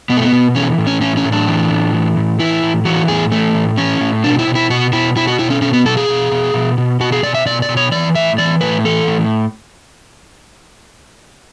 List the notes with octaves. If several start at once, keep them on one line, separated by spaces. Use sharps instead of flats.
B2 B3
A3
B3
B2
E3 C#4
A2
C#4
E3 C#4
C#4
A2
D4
E3
A2
E3
A2
E3 E4
A2
E3 F#4
A2 G#4
E3 A3
A2
E3 C#4
A2
B2 D4
E4
B2
E4
B2 F#4
B2 E4
B2 E4
F#4
B2 E4
C#4
B2 C#4
B3
B2 A4
G#4
B2
B2
B2
B2
B2 F#4
G#4
B2 D5
E5
B2 D5
D5
B2
C#5
E3 D5
A2 E5
E3 D5
A2 B4
E3 A4
A2